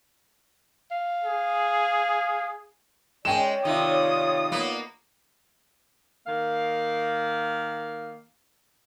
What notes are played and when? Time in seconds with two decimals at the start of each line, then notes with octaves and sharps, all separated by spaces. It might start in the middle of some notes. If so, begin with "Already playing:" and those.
0.91 F5
1.24 G#4
3.25 G#3 C#4 C#5 D5 G5 E7
3.65 C3 D#3 F4 D#6
4.52 A#3 B3
6.27 D#3 A#3 F5